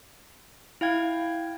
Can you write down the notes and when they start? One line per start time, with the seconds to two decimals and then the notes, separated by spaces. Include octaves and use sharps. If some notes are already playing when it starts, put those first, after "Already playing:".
0.81 E4 F5 G5 G#6